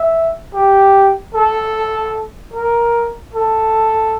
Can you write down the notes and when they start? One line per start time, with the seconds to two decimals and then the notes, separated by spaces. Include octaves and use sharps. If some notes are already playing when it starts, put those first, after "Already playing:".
Already playing: E5
0.54 G4
1.34 A4
2.53 A#4
3.34 A4